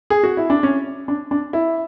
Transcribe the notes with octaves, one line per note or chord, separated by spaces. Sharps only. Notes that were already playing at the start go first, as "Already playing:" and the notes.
G#4
F#4
E4
D4
C#4
D4
D4
E4